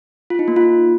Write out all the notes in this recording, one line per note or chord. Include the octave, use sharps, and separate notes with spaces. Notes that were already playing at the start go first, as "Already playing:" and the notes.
F4
D#4
A#3
F4